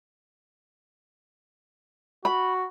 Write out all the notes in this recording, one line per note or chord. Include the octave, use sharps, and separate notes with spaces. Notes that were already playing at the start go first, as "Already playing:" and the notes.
F#4 B5